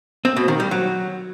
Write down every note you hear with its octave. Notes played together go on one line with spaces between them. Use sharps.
C4
B2
D#3
G3
F#3